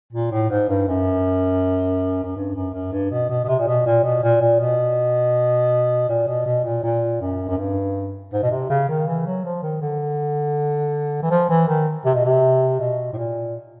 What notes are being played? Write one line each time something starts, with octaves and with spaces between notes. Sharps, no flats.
A#2
A2
G#2
G2
F#2
F#2
G2
F#2
F#2
G2
B2
B2
B2
C3
A#2
B2
A#2
B2
A#2
A#2
B2
A#2
B2
B2
A#2
A#2
F#2
F#2
G2
G#2
B2
C3
C#3
D#3
E3
F#3
F3
D#3
D3
E3
F3
E3
D#3
C3
B2
C3
B2
A2
A#2